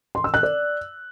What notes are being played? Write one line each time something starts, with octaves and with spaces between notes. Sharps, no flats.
C6
E6
F#6
D5